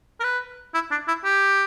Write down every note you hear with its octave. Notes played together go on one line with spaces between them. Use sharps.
A#4
B4
E4
D4
E4
G4